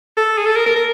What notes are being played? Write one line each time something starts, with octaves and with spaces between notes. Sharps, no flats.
A4
G#4
A4
A#4
A#4
A#4